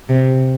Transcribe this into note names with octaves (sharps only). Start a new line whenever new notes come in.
C3